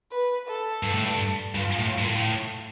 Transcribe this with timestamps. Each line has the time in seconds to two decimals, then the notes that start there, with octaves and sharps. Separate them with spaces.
0.11 B4
0.47 A4
0.83 G2
0.94 A2
1.04 G2
1.55 G2 F4
1.79 A2
1.98 G2
2.02 A2